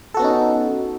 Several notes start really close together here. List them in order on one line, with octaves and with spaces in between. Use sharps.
A4 F#4 B3 C#4 D#4